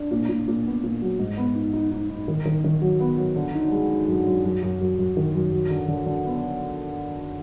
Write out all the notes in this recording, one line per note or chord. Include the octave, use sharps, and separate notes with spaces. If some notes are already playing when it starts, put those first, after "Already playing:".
Already playing: D4
A#2
A#2
A#2
B3
A#2
F#3
G#2
B3
D#4
D#4
D#4
D#4
D#3
D#3
D#3
F#3
B3
F#3
D3
D#4
G#3
D#4
F#2
F#2
F#2
F#2
F#2
F#2
D#3
F#2
F#3
D3
D3
D3
B3